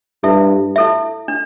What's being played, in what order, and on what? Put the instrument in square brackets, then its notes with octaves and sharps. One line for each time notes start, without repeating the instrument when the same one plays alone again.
[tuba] G2 [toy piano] E4 A4 E5
[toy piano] E4 A4 E5
D4